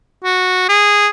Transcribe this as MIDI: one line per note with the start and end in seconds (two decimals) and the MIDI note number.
0.24 0.68 66
0.69 1.09 68